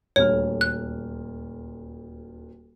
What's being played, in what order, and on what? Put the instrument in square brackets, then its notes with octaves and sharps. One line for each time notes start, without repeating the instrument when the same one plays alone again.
[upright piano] D#1 D2 F6 [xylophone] C#5
[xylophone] F#6